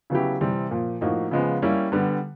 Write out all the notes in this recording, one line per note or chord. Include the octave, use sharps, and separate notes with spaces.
C#3 F#3 B3 E4 G4
C3 E3 G3 C4
A#2 F3 A#3
A2 F3 A#3 D#4 F#4
C#3 F3 G#3 B3
G3 A#3 C#4 E4
D3 G3 B3